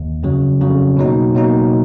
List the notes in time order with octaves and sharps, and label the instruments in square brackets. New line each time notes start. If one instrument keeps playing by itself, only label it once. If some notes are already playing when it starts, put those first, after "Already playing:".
Already playing: [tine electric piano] D#2
F2 C#3 F#3
F2 C#3 F#3
B2 F#3 A#3 D#4
B2 F#3 A#3 D#4